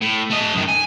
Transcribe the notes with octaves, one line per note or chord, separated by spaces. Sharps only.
A2
A3 D#5
F#2 D#3
G#5